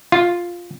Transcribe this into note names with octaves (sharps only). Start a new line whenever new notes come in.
F4